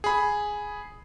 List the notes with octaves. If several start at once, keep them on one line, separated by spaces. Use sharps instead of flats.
G#4 B5